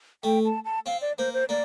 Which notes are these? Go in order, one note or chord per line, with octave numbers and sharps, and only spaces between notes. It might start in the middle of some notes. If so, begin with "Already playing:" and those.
A3 G5
A5
A5
C4 F5
D5
A#3 C5
C5
A#3 D5